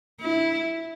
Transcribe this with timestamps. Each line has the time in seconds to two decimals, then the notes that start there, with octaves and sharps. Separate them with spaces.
0.21 E4